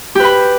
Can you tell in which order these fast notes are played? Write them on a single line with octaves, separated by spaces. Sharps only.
G4 B4 B5